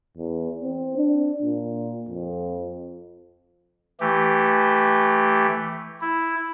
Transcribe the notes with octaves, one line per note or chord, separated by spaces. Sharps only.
E2
C4
D4
A#2
F2
E3 A3 G4
E4